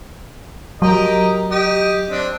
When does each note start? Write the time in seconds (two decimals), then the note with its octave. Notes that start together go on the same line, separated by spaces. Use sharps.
0.82 F#3 G4 A#4 D#5
1.51 G4 D#5
2.10 C4 D4